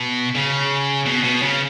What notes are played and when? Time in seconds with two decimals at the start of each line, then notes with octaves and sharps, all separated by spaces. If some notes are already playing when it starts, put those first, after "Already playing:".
Already playing: B2
0.35 C#3
1.06 B2
1.24 B2
1.43 C#3